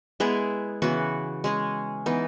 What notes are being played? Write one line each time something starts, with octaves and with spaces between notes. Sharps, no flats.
G#3 B3 E4 G#4
C#3 E3 B3 F#4
G#3 C#4 G#4
E3 B3 D#4